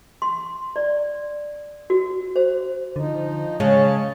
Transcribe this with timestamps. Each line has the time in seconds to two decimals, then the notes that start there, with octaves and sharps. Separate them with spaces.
0.22 C6
0.76 D5
1.90 F#4
2.36 C5
2.96 D3 F3 D#4
3.60 C#3 G#3 C#4 C#5 A5